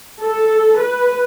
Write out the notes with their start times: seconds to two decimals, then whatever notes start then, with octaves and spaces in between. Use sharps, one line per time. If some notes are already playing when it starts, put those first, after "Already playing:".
0.22 A4
0.79 B4